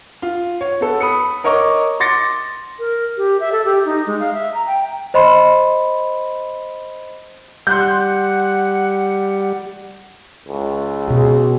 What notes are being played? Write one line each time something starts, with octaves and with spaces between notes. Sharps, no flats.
F4
C#5
B3 A4
B5 D#6 C#7
A#4 C#5 D#5 C#6 D6
C6 D6 A6 A#6 C#7
A#4
G4
E5
A4
G4
D#4
G#3
F5
E5
A#5
G5
C5 D#5 B5 C6
G3 F#5 C6 F#6 G6
C#2
B2 G#4